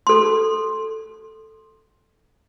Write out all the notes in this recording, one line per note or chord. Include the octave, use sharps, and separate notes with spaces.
A4 C6